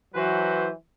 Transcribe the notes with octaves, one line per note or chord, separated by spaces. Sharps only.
E3 F#3 F#4 B4 C5